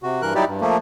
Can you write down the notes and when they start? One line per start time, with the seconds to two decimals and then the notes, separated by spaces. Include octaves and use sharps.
0.03 C3 F#4
0.22 G2 E3 A#4 F#6
0.35 F#3 G3 D#4 E4 G4 D5
0.48 G2
0.61 F3 A3 A#3